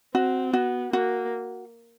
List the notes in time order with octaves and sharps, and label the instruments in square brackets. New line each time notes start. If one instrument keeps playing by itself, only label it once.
[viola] C4 [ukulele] F#4
[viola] B3 [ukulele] F#4
[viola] A#3 [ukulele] F#4